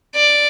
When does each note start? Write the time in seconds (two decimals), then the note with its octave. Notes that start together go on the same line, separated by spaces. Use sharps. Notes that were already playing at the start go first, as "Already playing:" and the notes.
0.15 D5